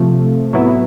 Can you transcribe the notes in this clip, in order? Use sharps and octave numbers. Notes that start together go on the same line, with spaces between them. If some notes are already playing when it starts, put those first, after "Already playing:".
Already playing: C3 F3 A3
A2 F#3 B3 E4